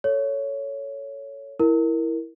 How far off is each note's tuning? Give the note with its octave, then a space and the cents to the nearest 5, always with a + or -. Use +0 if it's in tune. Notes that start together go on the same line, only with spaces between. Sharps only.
A4 +10 C#5 +10
E4 +0 A#4 +0